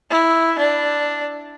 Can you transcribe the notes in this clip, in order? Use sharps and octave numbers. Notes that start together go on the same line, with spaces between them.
E4
D4